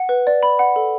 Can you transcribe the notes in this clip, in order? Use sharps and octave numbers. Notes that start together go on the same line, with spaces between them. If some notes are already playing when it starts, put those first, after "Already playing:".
Already playing: F#5
B4
D5
B5
F#5
A4